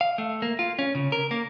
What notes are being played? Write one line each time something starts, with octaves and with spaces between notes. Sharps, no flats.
F5
A3
A#3
F4
C#4
C#3
A#4
A#3